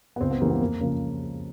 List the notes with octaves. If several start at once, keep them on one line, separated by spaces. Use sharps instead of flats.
B3
C#2 C4
B3
C#3 E3 G3 A#3
B3
F2 A#3
C#3 F3 A#3